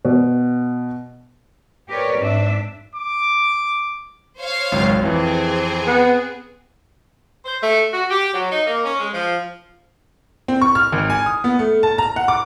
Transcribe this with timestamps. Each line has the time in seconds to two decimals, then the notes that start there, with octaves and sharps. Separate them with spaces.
0.05 B2
1.89 G4 A#4 B4 C#5 D5
2.20 G#2 C4 D4 E5
2.96 D6
4.38 C5 C#5 F5
4.72 G#1 C#2 F#3
5.03 F2 E3 C4 G#4
5.87 B3
7.45 C5
7.62 A3
7.92 F#4
8.10 G4
8.34 F#3
8.50 D#4
8.66 A#3
8.84 C#4
8.99 G#3
9.13 F3
10.48 C4
10.61 C#6
10.75 F6
10.92 G#1
11.10 G#5
11.26 D#6
11.44 B3
11.59 A3
11.83 A5
11.98 A#5
12.16 F#5
12.28 D6